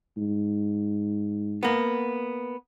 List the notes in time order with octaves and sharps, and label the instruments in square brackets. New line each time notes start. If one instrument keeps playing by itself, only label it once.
[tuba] G#2
[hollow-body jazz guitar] A#3 B3